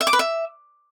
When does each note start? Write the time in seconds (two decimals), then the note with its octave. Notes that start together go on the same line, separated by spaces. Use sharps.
0.01 E5
0.07 D6
0.13 B4
0.19 E5